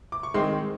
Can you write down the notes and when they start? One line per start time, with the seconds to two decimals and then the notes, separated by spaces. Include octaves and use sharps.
0.12 D6
0.23 C#6
0.34 D#3 G#3 C4 D#4 C6